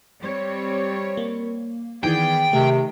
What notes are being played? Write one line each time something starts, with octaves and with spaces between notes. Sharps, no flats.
G3 C4 C#5
A#3
D#3 E3 B3 G#4 D5 G5
C3 D#3 A3